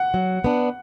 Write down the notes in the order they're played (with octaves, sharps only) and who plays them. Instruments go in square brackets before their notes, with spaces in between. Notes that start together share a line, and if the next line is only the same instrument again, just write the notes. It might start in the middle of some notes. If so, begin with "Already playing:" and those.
Already playing: [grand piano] F#5
[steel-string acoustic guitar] F#3
B3 D4